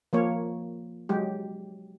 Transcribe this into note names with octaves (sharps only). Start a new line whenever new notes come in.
F3 A#3 C#5
F#3 G#3 G4